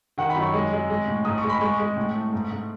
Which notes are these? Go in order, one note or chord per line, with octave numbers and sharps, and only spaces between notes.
D#3 F#5
B5
F#2
C#6
G#3
G#3
G#3
A2
G#2 D#6
C#6
G#3
B5
G#3 C#6
G#3
A2
A3
G#2
G#2